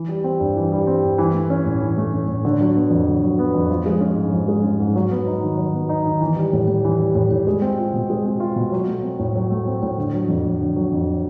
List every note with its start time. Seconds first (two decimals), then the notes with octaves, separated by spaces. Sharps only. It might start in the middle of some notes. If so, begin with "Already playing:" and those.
Already playing: E3
0.09 G3
0.24 C4
0.40 G2
0.56 E3
0.72 G3
0.87 C4
1.03 G2
1.18 E3
1.34 A3
1.50 C#4
1.66 A2
1.81 E3
1.98 A3
2.13 C#4
2.28 A2
2.45 D3
2.60 F#3
2.76 B3
2.91 F2
3.07 D3
3.23 F#3
3.39 B3
3.54 F2
3.70 F3
3.86 G#3
4.01 C#4
4.16 G#2
4.33 F3
4.48 G#3
4.63 C#4
4.80 G#2
4.95 F#3
5.11 B3
5.27 D#4
5.43 D#3
5.58 F#3
5.74 B3
5.89 D#4
6.05 D#3
6.21 E3
6.36 G3
6.53 A2
6.68 A2
6.84 E3
7.00 G3
7.15 A2
7.31 A2
7.47 G#3
7.62 C4
7.78 F4
7.93 B2
8.10 G#3
8.26 C4
8.40 F4
8.56 B2
8.72 F#3
8.88 A3
9.03 C4
9.19 A2
9.35 F#3
9.51 A3
9.67 C4
9.83 A2
9.98 D3
10.14 F#3
10.29 F2
10.45 F2
10.61 D3
10.76 F#3
10.92 F2